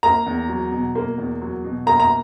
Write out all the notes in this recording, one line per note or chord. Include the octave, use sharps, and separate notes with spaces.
A#3 A#5
E2
F#3
B2
A#3
E2
F#3
B2
A#3 A#5
A#5